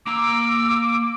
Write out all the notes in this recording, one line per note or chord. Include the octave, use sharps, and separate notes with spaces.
A#3 A#5 D6 E6